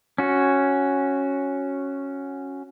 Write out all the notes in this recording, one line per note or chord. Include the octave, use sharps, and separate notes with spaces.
C#4 F#4